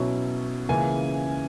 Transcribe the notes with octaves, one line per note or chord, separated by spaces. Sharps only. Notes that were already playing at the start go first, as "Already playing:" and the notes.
Already playing: B2 F#3 C#4 E4
C#2 C#3 E3 A#3 G#5